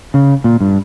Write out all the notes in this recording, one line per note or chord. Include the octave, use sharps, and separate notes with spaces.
C#3
A#2
G2